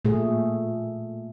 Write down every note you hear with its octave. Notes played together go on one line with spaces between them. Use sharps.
A#2 A3 G#4